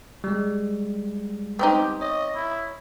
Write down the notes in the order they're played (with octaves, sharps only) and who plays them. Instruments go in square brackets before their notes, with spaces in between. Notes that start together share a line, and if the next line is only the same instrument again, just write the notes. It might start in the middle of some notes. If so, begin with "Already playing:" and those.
[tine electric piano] G3 G#3
[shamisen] B3 C4 D#4 [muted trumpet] G4
[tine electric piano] C#5 [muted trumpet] D#5
[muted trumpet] E4